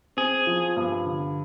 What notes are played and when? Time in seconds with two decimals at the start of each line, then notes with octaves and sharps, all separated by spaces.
0.17 C4 G#4
0.47 F3
0.77 G2
1.06 D3